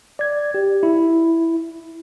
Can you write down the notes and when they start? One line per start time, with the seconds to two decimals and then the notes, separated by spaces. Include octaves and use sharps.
0.19 D5 G#6
0.54 G4
0.83 E4